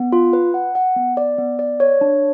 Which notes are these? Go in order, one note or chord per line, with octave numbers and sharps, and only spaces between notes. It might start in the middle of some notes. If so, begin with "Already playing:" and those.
Already playing: B3
F4
B4
F#5
F#5
B3
D5
B3
D5
C#5
D4